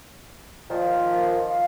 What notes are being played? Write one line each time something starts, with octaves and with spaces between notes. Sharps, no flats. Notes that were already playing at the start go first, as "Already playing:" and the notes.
A#2 D#3 F3 F4
F5